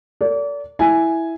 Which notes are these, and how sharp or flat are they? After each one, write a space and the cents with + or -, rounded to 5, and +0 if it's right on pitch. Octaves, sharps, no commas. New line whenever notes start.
A#4 -45 D5 -35
E4 +0 G#5 +0